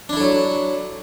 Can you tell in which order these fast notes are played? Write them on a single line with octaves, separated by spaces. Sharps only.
D4 E4 A4 F#3